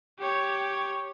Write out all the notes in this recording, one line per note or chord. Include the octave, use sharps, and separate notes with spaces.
G4 C#5